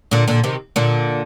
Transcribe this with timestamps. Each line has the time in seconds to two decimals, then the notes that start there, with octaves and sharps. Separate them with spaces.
0.11 A#2 D3
0.28 A#2 D3
0.44 C3 D#3
0.76 A#2 D3